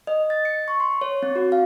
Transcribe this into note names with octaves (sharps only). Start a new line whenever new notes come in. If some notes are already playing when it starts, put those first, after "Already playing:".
D#5
A6
C#7
C#6
C6
C#5
C4
F#4
F5